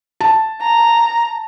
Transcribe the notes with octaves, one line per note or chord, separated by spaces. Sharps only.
A5
A#5